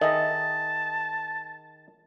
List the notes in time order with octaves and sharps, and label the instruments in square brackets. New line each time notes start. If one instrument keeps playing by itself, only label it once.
[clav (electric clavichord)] D#3 G#4 [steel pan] D#5 E5 [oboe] A5